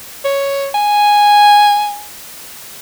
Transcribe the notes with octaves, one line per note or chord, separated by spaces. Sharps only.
C#5
G#5